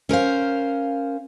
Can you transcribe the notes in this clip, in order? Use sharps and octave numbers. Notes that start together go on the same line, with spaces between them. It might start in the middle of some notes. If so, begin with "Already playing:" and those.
C#4 A#4 C5 F5